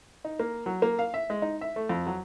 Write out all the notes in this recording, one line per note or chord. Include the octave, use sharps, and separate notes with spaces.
D#4
A#3
F#3
A#3
F5
E5
G#3
D#4
E5
A3
F2
F#3